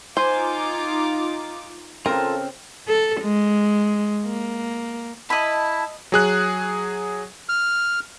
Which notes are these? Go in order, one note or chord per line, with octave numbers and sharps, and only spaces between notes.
D#4 F4 C5 G#5 C6 D6
C#3 C4 F4 A4 A#4
A4
G#3
A#3
E4 D#5 A5 B5
F#3 G#4 F#6
F6